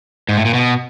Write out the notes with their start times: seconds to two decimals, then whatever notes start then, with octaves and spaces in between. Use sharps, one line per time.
0.29 G#2
0.37 A2
0.45 A#2
0.54 B2